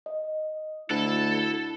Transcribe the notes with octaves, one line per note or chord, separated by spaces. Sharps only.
D#5
D2 E4 A4 F#6